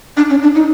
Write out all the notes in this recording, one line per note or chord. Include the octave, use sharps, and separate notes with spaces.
D4
C#4
D4
D#4